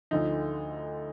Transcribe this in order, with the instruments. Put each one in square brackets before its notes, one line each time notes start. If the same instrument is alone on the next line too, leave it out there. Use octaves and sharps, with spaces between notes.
[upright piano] D2 D3 F3 D#4